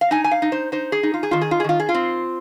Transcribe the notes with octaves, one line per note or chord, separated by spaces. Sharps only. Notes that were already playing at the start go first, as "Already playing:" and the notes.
F5
D#4 G#5
G#5
F5
D#4
C5
D#4 C5
G#4
D#4
F4
G#4
D#3 F4
G#4
F4
G#4
D#3 F4
G#4
F4
C4